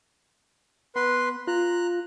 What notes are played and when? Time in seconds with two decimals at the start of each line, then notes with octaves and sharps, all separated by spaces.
0.96 B3 B4 C6
1.47 F4 A#5 F#6